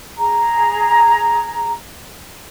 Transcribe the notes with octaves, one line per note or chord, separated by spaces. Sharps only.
G#4 A#5